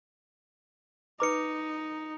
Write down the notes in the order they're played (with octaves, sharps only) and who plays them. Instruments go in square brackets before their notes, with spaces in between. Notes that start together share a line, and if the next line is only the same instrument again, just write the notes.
[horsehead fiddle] D#4 [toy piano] B4 D6 [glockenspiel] A#5 C#7